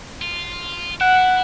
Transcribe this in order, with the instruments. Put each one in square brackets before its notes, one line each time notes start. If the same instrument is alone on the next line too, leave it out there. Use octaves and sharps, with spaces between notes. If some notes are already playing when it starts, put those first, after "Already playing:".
[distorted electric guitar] F4
[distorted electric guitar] E4 [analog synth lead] F#5